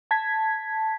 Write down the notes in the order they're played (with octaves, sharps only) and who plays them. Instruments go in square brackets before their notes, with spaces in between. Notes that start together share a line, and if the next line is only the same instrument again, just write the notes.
[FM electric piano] A5 G#6 B6